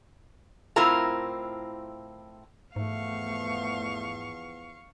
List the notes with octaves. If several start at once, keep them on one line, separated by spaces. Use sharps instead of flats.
A2 C4 E4 F4 A#4 A#5
E2 G#2 F3 A3 B3 F5 C#6